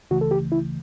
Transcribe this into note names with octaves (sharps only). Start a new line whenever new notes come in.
C#2 C#3 E3 A3 F#4
A4
G4
E4